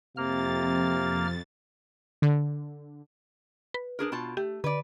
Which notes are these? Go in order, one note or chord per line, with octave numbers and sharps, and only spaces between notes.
F2 C3 A#3 F6 A6
D3
B4
D4 G#4 A#4
B2 F4 A5
A3 G4
D3 B4 D5